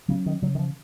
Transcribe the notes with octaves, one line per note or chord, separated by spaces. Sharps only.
C#3 F#3 C#4
D#3
C#3 F#3
D#3
F3